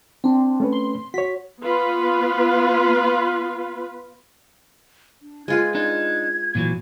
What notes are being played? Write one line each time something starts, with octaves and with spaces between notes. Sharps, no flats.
C4 D4
A3 C#4 B4
C6
F#4 C#5 B6
B3 F4 B4
D4
G#3 F4 B4 G#6
D4 D#4 G#6
A#2 E3 F#3